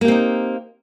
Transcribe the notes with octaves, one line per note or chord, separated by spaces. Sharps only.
A#3 C4 D#4 G4